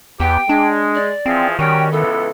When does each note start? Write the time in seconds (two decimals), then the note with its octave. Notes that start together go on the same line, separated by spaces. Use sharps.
0.20 E2 B3 G4 G5
0.49 G#3 D4
0.95 D5
1.26 E3 F3 C4 G#4
1.59 D#3 G3 C#4 F#4 G5
1.92 C#2 E3 B3 A4